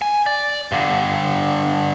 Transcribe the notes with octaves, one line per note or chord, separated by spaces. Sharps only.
G#5
D5
G2 D3